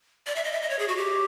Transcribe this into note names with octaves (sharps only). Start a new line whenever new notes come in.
D5
E5
D#5
E5
D#5
C#5
G#4
F#4
G4